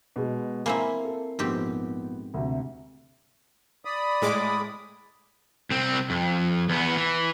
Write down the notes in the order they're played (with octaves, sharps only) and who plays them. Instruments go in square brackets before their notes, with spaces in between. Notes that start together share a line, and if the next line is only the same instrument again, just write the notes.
[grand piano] B2 G#3
[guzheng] A#3 C4 E4 [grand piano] G#5 A#5 C7
[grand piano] A4
[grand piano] A#1 B3 [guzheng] G#2 C4 G4
[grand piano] D2 C3
[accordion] D5 B5 D#6
[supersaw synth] A2 G#3 D6
[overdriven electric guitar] C2 C4
F2
E2 B3
E3